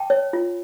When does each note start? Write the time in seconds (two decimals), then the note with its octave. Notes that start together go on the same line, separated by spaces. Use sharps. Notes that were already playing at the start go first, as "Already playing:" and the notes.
Already playing: G5 A5
0.10 C#5
0.33 F4